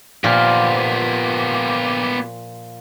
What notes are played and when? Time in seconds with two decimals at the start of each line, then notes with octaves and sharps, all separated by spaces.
0.24 A#2 F3 B3 G4